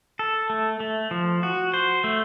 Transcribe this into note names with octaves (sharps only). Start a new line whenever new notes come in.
A4
A3
A3
F3
F#4
C5
A3